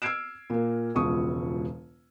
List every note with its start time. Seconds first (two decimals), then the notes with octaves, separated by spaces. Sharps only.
0.02 E6 F6 G#6 C7 D7 E7
0.50 A#2 A#3
0.95 E1 C#2 B2 F3 C#6 D#6